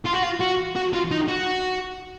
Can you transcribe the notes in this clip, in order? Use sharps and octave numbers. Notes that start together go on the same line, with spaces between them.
F4
F#4
F4
F#4
F#4
F4
D#4
F#4